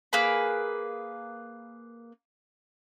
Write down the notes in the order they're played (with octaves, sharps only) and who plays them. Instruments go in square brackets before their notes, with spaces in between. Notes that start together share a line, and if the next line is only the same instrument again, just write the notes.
[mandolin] A#3 G#4 B4 B5